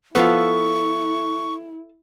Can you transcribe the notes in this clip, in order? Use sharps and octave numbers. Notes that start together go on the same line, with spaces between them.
F3 B3 E4 A4 B4 F5 C#6